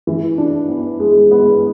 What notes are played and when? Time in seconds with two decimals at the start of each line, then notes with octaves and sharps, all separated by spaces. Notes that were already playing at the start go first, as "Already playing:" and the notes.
0.07 E3
0.38 D4
0.69 B3
1.00 G#3
1.31 B3